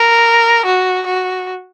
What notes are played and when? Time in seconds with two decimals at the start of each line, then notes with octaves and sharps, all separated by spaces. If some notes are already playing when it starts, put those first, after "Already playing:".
Already playing: A#4
0.65 F#4
1.06 F#4